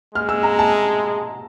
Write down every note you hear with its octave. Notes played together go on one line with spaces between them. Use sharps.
G#3 F6
E6
A#5
A5